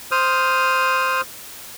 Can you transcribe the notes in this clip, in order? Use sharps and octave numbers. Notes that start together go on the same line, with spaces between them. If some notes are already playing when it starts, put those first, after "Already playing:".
C5 D#6 F6